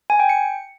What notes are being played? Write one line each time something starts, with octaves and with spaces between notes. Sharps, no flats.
G#5
G5
C#7